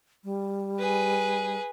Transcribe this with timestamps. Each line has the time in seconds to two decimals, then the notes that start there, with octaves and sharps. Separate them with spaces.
0.24 G3
0.79 G#4 B4